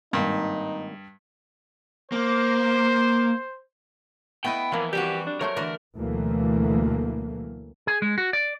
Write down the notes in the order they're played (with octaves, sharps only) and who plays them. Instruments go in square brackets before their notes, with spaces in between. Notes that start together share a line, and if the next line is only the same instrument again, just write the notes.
[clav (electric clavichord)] G#1 A#3 [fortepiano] G2 [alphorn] D#4
[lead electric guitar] A#3 [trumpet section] C5
[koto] A3 B4 D#5 [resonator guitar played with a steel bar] B3 E4 [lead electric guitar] G5
[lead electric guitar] E3 [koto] F3 A#3
[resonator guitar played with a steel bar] G3 C4 F#4 [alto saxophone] G4
[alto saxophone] D4
[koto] F#3 A3 C5 [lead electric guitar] A#4 [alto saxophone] C#5
[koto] D3 E3 F#4 [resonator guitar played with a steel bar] A3
[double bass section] D2 B2 E3 F#3 A3 A#3
[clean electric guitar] G#4
G#3
F#4
D5